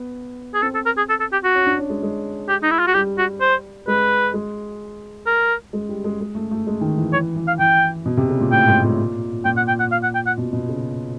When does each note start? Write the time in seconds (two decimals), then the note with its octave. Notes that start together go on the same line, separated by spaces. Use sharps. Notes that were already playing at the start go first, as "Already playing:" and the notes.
Already playing: B3
0.54 G#4
0.62 C4 A4
0.75 A4
0.86 A#4
0.97 G#4
1.09 A4
1.20 A4
1.32 G4
1.44 F#4
1.55 C#4
1.66 D4
1.79 C#4
1.90 G#3
2.02 G#3
2.48 G4
2.63 D#4
2.71 E4
2.79 F4
2.87 F#4
2.94 G3 G4
3.18 F#4
3.41 C5
3.87 G#3 B4
4.34 G#3
5.26 A#4
5.73 G#3
5.89 G3
6.04 G#3
6.20 G#3
6.35 A3
6.51 A3
6.67 G#3
6.81 D#3
6.97 E3
7.13 E3 C#5
7.36 E3
7.48 F5
7.59 E3 G5
8.06 B2
8.17 C3
8.29 C#3
8.40 A#2
8.51 A2 G5
8.68 G#2
8.83 A#2
9.45 A#2 G5
9.57 F#5
9.68 G5
9.80 F#5
9.92 F5
10.03 F#5
10.15 G5
10.27 F#5
10.38 B2
10.53 B2
10.69 C#3